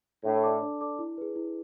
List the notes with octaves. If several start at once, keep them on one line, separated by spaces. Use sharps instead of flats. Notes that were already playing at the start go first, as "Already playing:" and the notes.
A2 D4
A4 D5 A5 D6
D4
A4 D5 A5 D6
E4
G#4 B4
E4